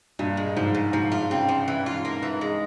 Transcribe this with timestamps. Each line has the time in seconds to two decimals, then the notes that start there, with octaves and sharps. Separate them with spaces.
0.19 G2 A#2
0.37 G#3
0.56 G#2 F3
0.75 A#2
0.93 G#2 F3
1.12 F4
1.30 C#3 C4
1.49 F3
1.68 E3
1.86 F4
2.05 A#3
2.22 E3
2.41 G#3